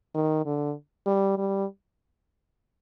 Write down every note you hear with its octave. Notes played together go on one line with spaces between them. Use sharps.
D#3
D3
G3
G3